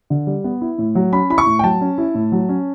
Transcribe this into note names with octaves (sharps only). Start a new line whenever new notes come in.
D3
G3
B3
E4
A2
F#3
C#4 B5
E4 B5
C#6
A2
G5
F#3 A5
C#4
E4
A2
F#3
C#4